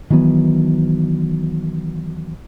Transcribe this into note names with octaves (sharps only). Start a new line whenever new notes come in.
D#3 E3 F#3 B3